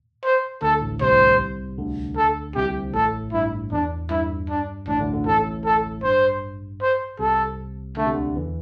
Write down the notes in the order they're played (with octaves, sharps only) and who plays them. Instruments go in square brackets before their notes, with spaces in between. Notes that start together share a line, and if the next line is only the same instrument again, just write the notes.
[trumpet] C5
[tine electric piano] D2 D3 [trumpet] A4
[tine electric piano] A1 A2
[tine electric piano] C2 C3 [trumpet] C5
[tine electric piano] D2 D3
[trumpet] A4
[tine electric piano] C2 C3 [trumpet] G4
[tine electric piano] A1 A2 [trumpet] A4
[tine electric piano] G2 [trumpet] E4
[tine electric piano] E2 [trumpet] D4
[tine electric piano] G2 [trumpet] E4
[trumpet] D4
[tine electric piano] A1 A2 [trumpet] D4
[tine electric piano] D2 D3
D2 D3
[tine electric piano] A1 A2 [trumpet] A4
[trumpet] A4
[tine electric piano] G2 [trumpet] C5
[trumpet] C5
[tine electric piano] C2 C3 [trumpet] A4
[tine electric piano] D3 [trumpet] A3
[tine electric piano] C3
D2 D3
E2 E3